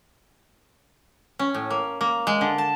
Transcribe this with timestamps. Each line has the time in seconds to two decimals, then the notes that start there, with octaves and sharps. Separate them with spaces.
1.39 C#4
1.54 A2
1.70 A#3
2.01 A#3
2.27 G#3
2.41 D3
2.58 A5